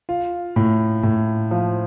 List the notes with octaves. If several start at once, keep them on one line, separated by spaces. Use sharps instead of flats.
F4
A2
A2
F3